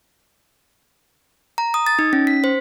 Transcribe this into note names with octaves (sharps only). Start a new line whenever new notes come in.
A#5
D#6
A6
D#4
C#4
B6
C5